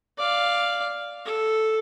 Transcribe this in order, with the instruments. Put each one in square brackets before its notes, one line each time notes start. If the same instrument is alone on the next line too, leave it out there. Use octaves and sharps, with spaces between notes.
[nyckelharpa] D5 F5
A4